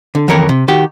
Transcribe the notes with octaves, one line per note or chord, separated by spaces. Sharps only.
D3
F2 D#3 E3 A#4 C#5
C3
D#3 F#4 G4